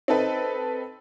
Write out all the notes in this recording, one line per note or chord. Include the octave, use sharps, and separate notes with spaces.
C4 D#4 A4 B4